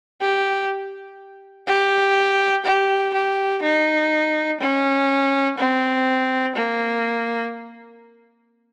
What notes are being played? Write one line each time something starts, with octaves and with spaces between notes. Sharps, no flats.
G4
G4
G4
G4
D#4
C#4
C4
A#3